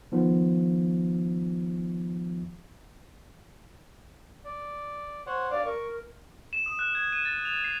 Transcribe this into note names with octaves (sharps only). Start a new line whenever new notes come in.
D#3 F3 B3
D5
C5 C#5 F#5
G2 D5 F5 D6
A#4 C#6
E7
D#6
F#6
G#6
D#7
A6
F7
C7